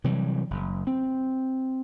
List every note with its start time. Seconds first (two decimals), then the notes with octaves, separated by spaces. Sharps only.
0.04 C3 E3 F#3 G3
0.50 F#1
0.87 C4